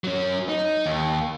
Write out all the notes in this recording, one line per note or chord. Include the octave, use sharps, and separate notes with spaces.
F#3 C#4
D#4
D#2